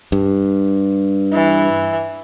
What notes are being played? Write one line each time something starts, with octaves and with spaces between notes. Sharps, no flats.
G2
E3